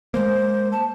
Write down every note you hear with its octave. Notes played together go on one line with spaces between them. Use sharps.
G#3 A#3 C5
A5